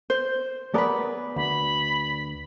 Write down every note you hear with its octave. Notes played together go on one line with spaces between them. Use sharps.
C5
B3 G#4 A#4 B4 D5
D2 B5